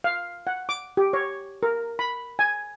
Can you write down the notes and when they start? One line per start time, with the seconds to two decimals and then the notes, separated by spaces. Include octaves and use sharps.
0.04 F5
0.47 F#5
0.69 D6
0.97 G4
1.13 C#5
1.63 A#4
1.99 B5
2.39 G#5